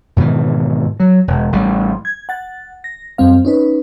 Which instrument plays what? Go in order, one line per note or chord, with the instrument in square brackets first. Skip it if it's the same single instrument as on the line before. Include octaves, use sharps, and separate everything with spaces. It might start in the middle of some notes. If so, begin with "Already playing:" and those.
[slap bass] G#2 B2 D#3 E3
F#3
E1
A1 G3
[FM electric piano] G#6
F#5 A6
A#6
F#2 G3 C4 F5
C#4 D#4 B4